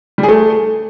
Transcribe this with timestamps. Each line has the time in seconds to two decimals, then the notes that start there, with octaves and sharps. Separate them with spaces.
0.18 G3
0.23 G#4
0.29 A3